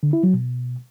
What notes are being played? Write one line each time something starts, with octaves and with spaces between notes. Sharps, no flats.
D3
E4
F#3
B2